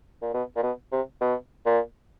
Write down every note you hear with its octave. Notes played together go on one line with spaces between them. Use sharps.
A#2
B2
A#2
B2
C3
B2
A#2